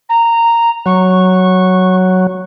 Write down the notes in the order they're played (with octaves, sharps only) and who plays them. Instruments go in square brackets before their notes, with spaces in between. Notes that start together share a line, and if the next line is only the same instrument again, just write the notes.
[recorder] A#5
[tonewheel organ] F#3 [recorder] C#6